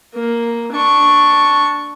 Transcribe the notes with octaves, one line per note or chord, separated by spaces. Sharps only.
A#3
D4 C#6